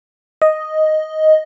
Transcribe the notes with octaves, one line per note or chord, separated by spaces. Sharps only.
D#5